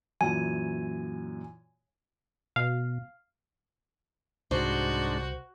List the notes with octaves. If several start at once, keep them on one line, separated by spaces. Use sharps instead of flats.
F#2 A#2 E3 G#5
B2 F5
C2 G#2 D4 F#4 C5